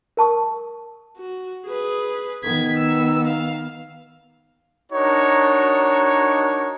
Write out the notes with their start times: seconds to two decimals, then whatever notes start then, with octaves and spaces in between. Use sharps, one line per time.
0.17 A#4 A5 C#6 D#6
1.17 F#4
1.66 G#4 B4
2.44 D#3 B3 G#6 B6
2.78 E6
3.28 F5
4.92 D4 D#4 F#4 A#4 C#5